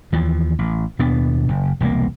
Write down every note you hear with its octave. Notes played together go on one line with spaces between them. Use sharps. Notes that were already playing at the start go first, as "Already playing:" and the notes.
D#2 E3 F3
A1
D#2 B2 B3 D4
F#1
E1 C2 A#3